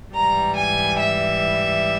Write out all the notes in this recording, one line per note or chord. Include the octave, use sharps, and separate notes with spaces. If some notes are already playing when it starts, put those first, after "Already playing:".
G#2 E3 G3 A#5
G#5
E5